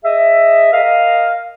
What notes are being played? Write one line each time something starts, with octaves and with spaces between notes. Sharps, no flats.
G#4 D#5 E5
A#4 D#5 F5